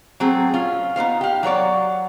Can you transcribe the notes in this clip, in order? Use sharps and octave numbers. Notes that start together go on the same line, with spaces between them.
F#3 A3 C4 G#4
C#4 F4
B3 D#4 C5 F5
G4 F5
F#3 F#4 C#5 D5